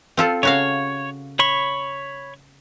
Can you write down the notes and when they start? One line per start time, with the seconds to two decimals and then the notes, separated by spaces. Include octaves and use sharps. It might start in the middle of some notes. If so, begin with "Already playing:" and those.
0.17 C4 F4 A4
0.43 C#3 F#4 C#5 F5
1.39 C#5 B5 C#6